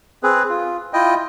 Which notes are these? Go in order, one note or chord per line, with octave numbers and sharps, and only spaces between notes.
C4 G#4 B4
F4
E4 F4 D#5 G5